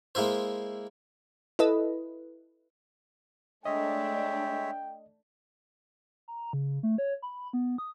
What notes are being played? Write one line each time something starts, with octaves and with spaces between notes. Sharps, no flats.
G#3 A#3 E4 C5
E4 A4 B4 D#5
G#3 A3 D4 C#5 D#5 E5 G5
A#5
C#3
A3
C#5
B5
B3
D#6